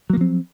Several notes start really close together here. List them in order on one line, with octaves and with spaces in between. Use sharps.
F#3 A#3 F3 C4